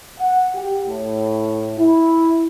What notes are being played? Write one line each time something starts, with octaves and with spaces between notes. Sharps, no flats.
F#5
G4
A2
E4